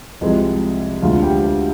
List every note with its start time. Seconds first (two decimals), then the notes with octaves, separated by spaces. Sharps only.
0.21 C2 C3 F3 G#3 D#5
1.02 D2 D3 G#3 F4 F5
1.23 G4 G5